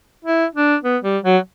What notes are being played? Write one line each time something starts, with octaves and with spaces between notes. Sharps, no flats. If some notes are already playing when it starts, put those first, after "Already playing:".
E4
D4
B3
G3
F#3